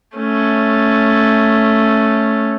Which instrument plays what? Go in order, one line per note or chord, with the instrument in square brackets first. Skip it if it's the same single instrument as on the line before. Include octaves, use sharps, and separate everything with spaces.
[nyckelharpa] A3 C#4